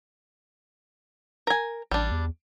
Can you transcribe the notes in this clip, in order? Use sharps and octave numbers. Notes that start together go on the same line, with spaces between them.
A#4 G#5
A1 G3 D4
E2